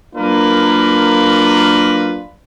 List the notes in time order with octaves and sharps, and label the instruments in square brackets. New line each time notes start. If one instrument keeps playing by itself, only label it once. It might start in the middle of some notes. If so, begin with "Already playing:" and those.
[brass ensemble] F#3 A#3 D4 F4 A#4 B4